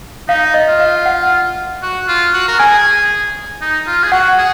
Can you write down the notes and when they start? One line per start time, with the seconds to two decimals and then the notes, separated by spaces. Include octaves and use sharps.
0.29 D#4 F5
0.54 D#5
0.68 F4
0.80 F5
1.06 F#5
1.82 F#4
2.08 F4
2.34 F#4
2.48 A#4
2.59 G#4 G#5
3.61 D#4
3.87 F4
4.03 G#4
4.12 F#4 F#5
4.38 G#4